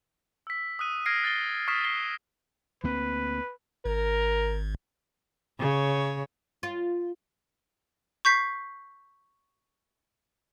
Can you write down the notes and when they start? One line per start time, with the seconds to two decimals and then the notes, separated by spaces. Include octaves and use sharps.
0.47 E6 B6
0.79 D#6 E6 F#6 D#7
1.06 F6 G#6 A#6 C7 D7
1.23 F#6 A6 B6 C7 G7
1.68 C#6 D#6 F6 B6 C7 E7
1.84 A6 C7 G7
2.84 D2 A#3 C4 B4
3.85 G#1 A#4
5.59 C#3 C#5
6.63 F4
8.25 C#6 G6 B6 C7